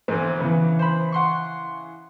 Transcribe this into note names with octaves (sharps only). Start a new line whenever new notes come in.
A1 E2 D3 C4
C#3 E3 B3
C5 B5
F#5 C6 C#6